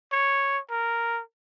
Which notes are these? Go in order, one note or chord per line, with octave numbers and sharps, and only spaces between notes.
C#5
A#4